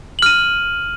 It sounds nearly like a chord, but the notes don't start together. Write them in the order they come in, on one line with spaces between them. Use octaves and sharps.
F#7 F6 D#7